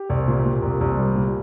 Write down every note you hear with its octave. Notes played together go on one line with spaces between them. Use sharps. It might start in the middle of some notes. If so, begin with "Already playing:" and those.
Already playing: G4
C2
A#2
A#2
C2
C2
G3
A#2